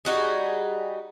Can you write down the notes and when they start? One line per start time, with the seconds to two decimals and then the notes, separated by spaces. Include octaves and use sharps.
0.05 G3 D#4 F#4 G#4